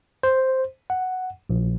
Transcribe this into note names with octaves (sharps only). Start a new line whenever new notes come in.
C5
F#5
A#1